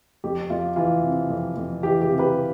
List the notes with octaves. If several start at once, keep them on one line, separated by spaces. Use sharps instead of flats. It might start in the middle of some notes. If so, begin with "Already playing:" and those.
F2 G4
F2 F4
E3 F4
C3
F2
F2
E3 G4
G4
C3
G4 B4